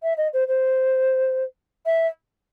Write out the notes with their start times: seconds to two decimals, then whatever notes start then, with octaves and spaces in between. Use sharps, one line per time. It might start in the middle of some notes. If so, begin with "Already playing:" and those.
0.03 E5
0.18 D#5
0.33 C5
0.48 C5
1.86 E5